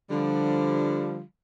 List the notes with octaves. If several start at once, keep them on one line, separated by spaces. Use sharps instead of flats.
D3 F3 G3